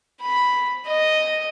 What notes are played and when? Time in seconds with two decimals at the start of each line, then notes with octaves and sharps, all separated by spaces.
0.21 B5
0.86 D#5